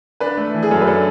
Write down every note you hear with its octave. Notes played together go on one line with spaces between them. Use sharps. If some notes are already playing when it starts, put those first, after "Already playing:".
D4 B4
A3
E3
G#4
F#2 A4
B4
D4 A4